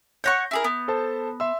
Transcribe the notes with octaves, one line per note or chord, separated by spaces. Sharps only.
C#5 F#5 C#6 G6 A#6
E4 G#4 A#4
B3
A4 C5 A5
E5 C6 E6